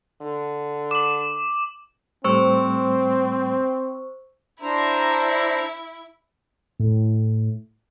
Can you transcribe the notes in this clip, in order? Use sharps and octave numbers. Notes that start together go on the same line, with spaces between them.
D3
D6 F#7
A2 G3 A3 C4 C5 C#6 E6
D4 E4 C5 A#5
A2